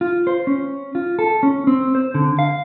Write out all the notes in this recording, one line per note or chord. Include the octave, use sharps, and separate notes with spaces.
F4
C5
C#4
F4
A4
C#4
C4
C5
D3
F5